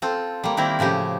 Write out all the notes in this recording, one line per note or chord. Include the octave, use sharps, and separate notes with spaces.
C4 F4 A4
G3 A#3
D#3 A#3 C4 E4 A#4
A2 C#3 F3 G4